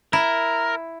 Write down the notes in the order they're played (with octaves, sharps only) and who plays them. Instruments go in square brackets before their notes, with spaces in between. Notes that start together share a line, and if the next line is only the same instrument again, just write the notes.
[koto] E4 [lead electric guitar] A#4